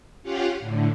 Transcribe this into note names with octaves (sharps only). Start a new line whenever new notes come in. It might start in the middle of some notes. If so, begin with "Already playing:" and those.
C#4 F4 G4 F5 F#5
A2 D3